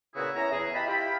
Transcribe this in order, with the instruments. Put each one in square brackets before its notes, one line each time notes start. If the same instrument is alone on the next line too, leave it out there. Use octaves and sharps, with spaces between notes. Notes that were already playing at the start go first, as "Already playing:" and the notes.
[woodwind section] A#2 C#3 B3 E4 F#4 G#4
C#4 E4 E5 A#5
E2 G#4
G4 D#5 E5 A5 B5
E4 F4 G4 G5 B5